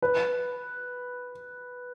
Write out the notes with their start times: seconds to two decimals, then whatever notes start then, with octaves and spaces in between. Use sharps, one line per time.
0.02 B4